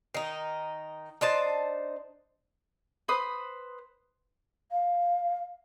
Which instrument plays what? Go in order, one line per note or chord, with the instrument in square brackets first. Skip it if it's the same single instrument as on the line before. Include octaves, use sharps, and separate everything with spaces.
[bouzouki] D#3 D#4
D4 D#4 C5 A5
[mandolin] B4 C5 B5 D#6
[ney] F5